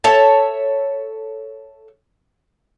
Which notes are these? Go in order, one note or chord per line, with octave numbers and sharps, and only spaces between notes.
A4 C#5 E5